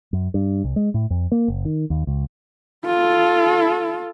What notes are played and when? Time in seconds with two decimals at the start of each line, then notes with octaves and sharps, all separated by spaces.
0.13 F#2
0.34 G2
0.64 C2
0.76 G#3
0.94 A2
1.10 F2
1.32 A#3
1.48 F#1
1.65 D#3
1.90 D#2
2.07 C#2
2.86 F4 A4